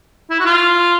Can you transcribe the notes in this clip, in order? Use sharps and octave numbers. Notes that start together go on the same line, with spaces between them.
E4
F#4
F4